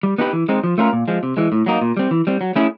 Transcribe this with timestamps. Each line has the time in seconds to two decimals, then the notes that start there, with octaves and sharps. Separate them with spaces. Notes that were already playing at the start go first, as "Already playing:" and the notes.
0.03 G3
0.18 B3 D#4 G4 B4
0.33 E3
0.49 G#3 C4 D#4
0.64 F3
0.78 A3 C#4 F4 A#4
0.93 A#2
1.08 F3 G#3
1.23 C3
1.37 E3 G#3
1.52 A2
1.66 F#3 A#3 D#4
1.81 A#2
1.97 G3 C4
2.11 E3
2.27 G3 C4
2.41 F#3
2.56 A3 C#4 E4 G#4